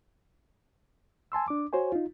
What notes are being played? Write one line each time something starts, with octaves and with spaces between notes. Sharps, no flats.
G#5 A5 C6 E6
D4 D6
F#4 C5 C#5 G#5
D#4 F4